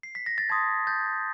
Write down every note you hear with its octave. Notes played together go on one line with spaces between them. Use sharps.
C7
B6
A#6
A6
A5 C6 D#6 G#6
G6 A6